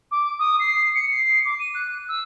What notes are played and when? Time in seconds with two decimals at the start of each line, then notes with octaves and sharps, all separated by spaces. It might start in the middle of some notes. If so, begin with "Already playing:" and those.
0.11 D6
0.39 D#6
0.59 C7
0.95 C#7
1.08 C7
1.45 D6
1.59 D#7
1.74 F#6
2.08 E6